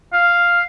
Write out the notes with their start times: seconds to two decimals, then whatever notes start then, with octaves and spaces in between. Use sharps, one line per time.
0.13 F5